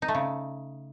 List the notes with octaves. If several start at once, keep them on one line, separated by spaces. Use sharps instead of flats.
D#4
A3
C#3